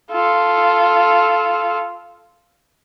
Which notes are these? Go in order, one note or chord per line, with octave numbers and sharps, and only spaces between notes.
F4 A4